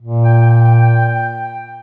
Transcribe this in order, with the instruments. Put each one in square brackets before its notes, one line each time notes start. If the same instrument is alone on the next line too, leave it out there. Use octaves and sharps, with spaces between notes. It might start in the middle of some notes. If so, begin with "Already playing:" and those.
[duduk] A#2
[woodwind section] G5